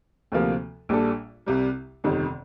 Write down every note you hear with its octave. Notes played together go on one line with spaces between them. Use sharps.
D2 C3 F3 A#3
A#1 A#2 G3 D4 A4
C2 C3 G3
G1 F2 C3 D#3